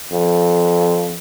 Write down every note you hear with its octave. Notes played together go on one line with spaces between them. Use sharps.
F2